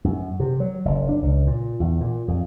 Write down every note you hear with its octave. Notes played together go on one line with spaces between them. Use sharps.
F#2
C3
F#3
F#1
D4
C#2
A#2
E2
A#2
F2